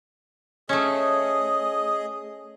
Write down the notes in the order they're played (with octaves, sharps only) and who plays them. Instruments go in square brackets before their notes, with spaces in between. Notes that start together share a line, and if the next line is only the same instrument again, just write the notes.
[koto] A3 C#4 [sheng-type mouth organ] G#4 D#5